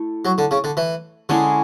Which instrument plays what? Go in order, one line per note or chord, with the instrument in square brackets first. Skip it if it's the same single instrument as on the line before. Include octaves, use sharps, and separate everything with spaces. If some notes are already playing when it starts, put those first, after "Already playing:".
Already playing: [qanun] A3 E4
[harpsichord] F#3
D3
C#3
D3
E3
[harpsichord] D3 [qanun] G#3 C#4 E4 G#4